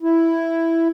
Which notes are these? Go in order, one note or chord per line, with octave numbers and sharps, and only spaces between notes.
E4